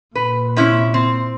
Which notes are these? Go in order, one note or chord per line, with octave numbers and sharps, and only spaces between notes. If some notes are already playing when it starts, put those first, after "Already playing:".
A#2 B4
C3 C#4 E4
C4